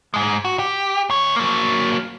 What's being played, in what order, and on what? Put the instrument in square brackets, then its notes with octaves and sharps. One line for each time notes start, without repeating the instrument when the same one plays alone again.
[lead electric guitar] G#2 G#3
F#4
G4
D2 C#5
F#3 A#3